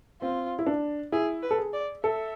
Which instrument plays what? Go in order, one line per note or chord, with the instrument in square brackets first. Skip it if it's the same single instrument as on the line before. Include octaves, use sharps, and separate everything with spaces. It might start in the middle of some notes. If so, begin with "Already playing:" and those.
[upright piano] C4 [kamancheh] F4
[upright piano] E4
D4
[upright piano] E4 [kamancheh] G#4
[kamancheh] B4
[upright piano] A4
G#4
[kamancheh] D5
[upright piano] A4 [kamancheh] E5